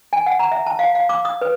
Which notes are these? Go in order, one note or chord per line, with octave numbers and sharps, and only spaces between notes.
G#5
F#5
A#5
E5
A5
F5
F5
D6
D#6
B4